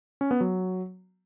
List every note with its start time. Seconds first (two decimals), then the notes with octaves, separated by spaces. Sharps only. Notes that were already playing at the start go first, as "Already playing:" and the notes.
0.21 C#4
0.31 B3
0.41 F#3